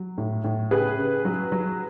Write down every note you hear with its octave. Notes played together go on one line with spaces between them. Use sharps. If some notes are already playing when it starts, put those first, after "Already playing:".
Already playing: F#3
A2
A2
C#3 G#4 B4
C#3
F#3
F#3